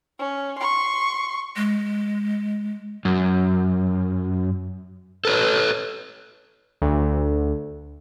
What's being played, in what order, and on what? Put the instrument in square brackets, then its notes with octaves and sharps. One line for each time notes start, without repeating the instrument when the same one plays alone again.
[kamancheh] C#4
C6 C#6
[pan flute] G#3
[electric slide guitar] F#2
A4 B4 C#5
[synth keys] D2